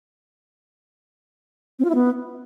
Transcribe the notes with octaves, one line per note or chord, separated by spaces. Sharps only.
C4
F4
E4
B3